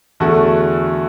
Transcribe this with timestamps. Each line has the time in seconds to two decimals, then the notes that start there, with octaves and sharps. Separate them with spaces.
0.20 E2 D3 A3 F#4 A4